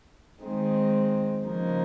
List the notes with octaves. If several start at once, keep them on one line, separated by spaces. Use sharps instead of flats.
D#3 G#3 C4 D#4
C#3 F3 A#3 D#4